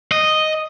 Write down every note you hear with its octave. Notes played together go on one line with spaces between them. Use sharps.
D#5